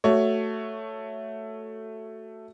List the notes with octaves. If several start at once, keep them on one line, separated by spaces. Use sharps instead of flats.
A3 F#4 C#5